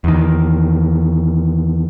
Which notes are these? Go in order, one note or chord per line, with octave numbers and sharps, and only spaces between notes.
E2 D#3